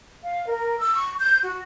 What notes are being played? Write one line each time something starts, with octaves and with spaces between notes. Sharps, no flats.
F5
A#4
E6
C#6
G6
F#4